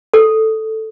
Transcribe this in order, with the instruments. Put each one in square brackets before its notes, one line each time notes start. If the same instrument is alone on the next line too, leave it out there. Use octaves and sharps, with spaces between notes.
[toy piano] A4